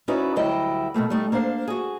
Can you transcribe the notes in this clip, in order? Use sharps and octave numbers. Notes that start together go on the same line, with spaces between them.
C#4 D#4 E4 F#4 B4 D5
D2 F#3 G3 E4 D#5 G5
B2 D#3 A3 A#3
G3 A3 D#4
A#3 D4 C5 F5 A5
F#4 G#4